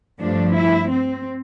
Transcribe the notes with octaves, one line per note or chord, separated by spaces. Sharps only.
G2 F3 A3 D4
E4
C4